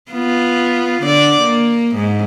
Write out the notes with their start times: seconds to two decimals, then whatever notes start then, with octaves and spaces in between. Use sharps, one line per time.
0.12 B3 F4
1.03 D3 D5
1.42 A#3
1.96 G#2